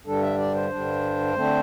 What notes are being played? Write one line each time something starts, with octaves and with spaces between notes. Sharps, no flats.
G2 D3 G3 D4 A4
E5
D5
C5
G2 D3 G3 D4
D3 A3 C4